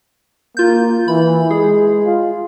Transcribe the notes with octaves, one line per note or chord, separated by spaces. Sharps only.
A#3 F4 G6
E3 B5
G#3 G#4
F4